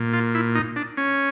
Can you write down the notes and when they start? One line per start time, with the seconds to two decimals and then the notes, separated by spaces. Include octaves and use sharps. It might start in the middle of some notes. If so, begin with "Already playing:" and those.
Already playing: A#2
0.13 F4
0.35 E4
0.55 D#4
0.76 D4
0.97 C#4